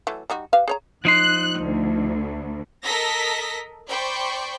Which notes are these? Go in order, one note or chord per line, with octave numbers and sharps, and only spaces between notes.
E3 F#3 A3
G3 D#4 F#4
G4 B4 F5
G#4 C#5 A#5
F3 D#4 C6 F#6
D2
A4 A#4 D#5 A#6 B6
C5 D5 G5 B5 C#6